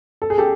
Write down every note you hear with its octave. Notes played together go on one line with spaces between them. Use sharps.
A4
G#4
G4 A4